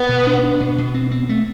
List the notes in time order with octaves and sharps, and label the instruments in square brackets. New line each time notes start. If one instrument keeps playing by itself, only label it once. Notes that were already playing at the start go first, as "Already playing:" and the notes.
Already playing: [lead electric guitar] B3
[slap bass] B2
D4
D4
B2
B2
C4
C4
A3